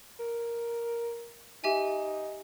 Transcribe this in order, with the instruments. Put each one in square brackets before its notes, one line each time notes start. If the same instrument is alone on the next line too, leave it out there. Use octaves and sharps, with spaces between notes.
[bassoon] A#4
[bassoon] D#4 [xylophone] G4 E5 G#5